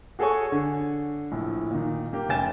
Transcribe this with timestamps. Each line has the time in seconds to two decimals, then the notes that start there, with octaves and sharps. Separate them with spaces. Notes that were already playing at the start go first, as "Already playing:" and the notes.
0.19 F#4 G#4 A4 C#5 G#5 C#6
0.52 D3
1.32 A#1 A2
1.71 A#2 D#3
2.13 A#3 G4
2.29 F1 C#4 G5 G#5 A6 E7